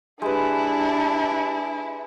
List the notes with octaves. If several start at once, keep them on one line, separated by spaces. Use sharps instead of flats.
G#3 D4 E4 G4 B4